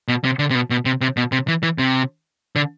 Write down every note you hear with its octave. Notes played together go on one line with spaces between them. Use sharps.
B2
C3
D3
C3
B2
B2
C3
C3
B2
C3
E3
E3
C3
D3